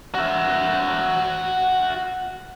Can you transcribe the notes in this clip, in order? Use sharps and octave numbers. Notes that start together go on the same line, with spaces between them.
F#4 E5